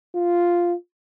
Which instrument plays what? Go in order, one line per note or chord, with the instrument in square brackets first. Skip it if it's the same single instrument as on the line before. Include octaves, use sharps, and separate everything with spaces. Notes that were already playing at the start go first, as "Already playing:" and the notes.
[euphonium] F4